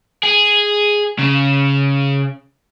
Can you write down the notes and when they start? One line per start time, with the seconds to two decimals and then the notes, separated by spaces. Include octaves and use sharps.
0.23 G#4
1.19 C#3